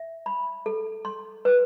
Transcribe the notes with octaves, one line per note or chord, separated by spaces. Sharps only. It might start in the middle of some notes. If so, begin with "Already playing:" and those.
Already playing: E5
B5
A4
C6
B4